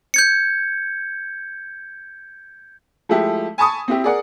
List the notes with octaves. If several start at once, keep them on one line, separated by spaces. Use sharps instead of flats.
G6 G#6 C#7
F3 G#3 A3 E4 G4
G#5 A5 B5 C#6 D#6
C4 E4 G4
G#4 A#4 D5 F#5